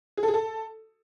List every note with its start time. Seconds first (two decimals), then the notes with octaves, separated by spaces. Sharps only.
0.17 G#4
0.23 A4
0.28 G#4
0.34 A4